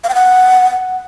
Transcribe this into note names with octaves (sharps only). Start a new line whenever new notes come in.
F5
G5
F#5